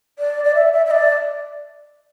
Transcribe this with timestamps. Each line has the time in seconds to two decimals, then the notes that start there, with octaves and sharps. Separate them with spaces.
0.19 D5
0.44 D5
0.55 E5
0.73 E5
0.86 E5
0.91 D5